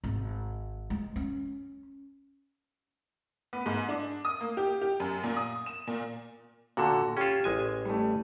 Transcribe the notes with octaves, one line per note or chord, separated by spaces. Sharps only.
G#1
G#3
C#4
B3
G#2
D4
D#6
A#3
G4
G4
F#2
A#2
D#6
E7
A#2
A#2 D3 F#4 A4 E7
C#4 F4 G4 E7
A1 G#3 G#5
G3 A3